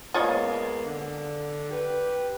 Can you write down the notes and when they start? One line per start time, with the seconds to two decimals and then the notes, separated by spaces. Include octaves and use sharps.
0.14 G#3 A#3 B3 F4 C#5 D#5
0.85 D3
1.71 G4 B4